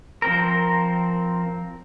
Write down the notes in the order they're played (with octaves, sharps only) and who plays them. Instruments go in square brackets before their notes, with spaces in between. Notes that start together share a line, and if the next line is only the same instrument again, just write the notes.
[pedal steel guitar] F3 C4 A#4